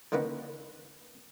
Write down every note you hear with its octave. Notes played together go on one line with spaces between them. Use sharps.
D3 D#3 A#3 C#4 B4